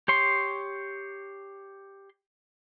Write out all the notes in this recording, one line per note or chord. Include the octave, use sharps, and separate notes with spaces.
G4 C#5 C6